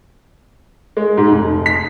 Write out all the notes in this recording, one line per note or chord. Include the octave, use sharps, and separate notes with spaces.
G#3
G#2
F1
B6